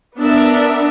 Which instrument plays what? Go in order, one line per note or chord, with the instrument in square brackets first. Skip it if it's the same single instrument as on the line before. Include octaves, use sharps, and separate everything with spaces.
[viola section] B3 D4 A#4 E5